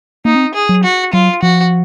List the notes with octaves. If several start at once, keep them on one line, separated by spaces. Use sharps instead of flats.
A#3 D#4
C4
G#4
F#3
F#4
F#3 F4
F3 F#4